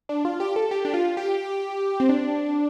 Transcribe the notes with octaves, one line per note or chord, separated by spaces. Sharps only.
D4
F4
G4
A4
G4
D4
F4
G4
C4
D4